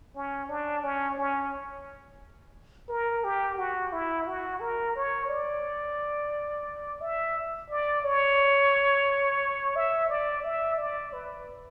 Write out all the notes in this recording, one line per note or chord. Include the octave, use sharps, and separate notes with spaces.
C#4
D4
C#4
C#4
A#4
G4
F#4
E4
F#4
A#4
C#5
D5
E5
D5
C#5
E5
D5
E5
D5
B4